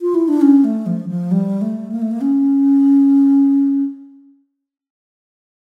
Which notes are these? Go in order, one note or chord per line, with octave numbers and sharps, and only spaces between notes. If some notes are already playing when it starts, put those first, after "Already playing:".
F4
E4
D4
C#4
A3
F3
F3
G3
A3
A#3
A3
A#3
C#4